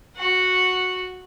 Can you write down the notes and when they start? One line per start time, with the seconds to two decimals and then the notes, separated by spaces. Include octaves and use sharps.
0.17 F#4 F#5